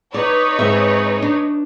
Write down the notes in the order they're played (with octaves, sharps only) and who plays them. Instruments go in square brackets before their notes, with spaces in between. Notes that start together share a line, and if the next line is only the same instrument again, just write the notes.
[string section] D#4 B4 C#5 [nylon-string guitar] D5
[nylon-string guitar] G#2 C4 E5
D4